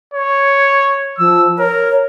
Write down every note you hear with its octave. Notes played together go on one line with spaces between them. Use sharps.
C#5
F3 E6
A#4 C#5